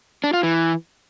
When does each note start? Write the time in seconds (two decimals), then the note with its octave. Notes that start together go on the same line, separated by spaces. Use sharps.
0.24 D4
0.33 F4
0.43 E3